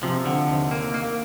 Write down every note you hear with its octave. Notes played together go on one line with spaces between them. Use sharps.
C3 F3
D3
D#2
A#3
A#3